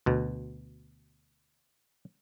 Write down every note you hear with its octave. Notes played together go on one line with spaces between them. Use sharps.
D2 B2